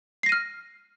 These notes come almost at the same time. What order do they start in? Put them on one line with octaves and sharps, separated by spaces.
C7 A#6 D#7 F6